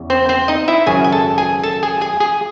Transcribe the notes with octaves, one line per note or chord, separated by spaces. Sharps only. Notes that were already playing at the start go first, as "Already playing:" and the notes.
Already playing: E2 C#3
C4 C5
C4 C5
D#4 D#5
E4 E5
G#1 F#2 C#3 F#3 G#4 G#5
G#5
A4 A5
G#4 G#5
A4 A5
G#4 G#5
G#4 G#5
G#4 G#5